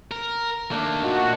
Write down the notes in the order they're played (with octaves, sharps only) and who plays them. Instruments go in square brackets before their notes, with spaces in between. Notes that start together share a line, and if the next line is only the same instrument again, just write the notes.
[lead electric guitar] A#4
[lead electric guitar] D#2 A#3 [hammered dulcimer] A3 D4
[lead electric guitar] A#2 [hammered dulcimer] D#3 [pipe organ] F#4